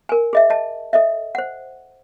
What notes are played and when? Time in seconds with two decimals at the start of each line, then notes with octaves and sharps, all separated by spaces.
0.09 A#4 G#5
0.33 G#4 D#5 E5
0.50 D#5 A5
0.93 A4 D#5 E5
1.35 C5 F#5